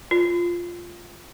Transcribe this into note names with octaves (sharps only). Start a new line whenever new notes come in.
F4